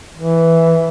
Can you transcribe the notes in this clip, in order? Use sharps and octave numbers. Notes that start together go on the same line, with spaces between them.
E3